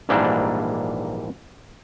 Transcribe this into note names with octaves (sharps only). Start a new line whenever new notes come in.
A#1 G#2 E3 G3 A#3 D4